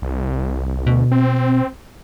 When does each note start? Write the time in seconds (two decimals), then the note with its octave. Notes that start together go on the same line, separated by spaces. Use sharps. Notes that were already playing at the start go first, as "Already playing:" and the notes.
0.02 C2
0.87 D2 B2
1.12 C4